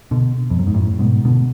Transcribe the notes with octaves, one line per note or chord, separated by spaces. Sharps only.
B2 D3
F2
F#2
G#2
F#2 A2
G#2 B2
B2 D3